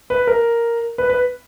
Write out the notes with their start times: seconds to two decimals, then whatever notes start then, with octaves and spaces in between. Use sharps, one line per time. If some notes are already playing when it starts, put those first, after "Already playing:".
0.10 B4
0.27 A#4
0.98 B4
1.10 B4